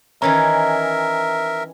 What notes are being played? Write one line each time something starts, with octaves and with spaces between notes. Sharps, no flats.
D#3 E3 C#4 A#4 E5 A#5